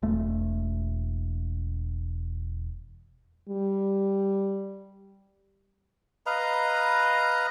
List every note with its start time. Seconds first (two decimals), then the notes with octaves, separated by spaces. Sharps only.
0.02 E1 A3
3.49 G3
6.26 B4 D#5 F5 A#5